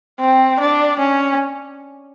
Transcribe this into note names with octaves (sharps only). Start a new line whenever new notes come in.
C4
D4
C#4